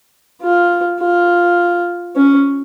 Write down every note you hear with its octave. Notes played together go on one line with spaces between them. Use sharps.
F4
F4
C#4